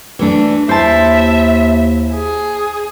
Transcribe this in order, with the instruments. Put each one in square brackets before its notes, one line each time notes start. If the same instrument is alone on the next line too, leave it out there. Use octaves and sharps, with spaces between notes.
[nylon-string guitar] E3 A3 D4
[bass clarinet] D#2 [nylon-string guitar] E4 [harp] C5 A5 [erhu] E5
[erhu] G#4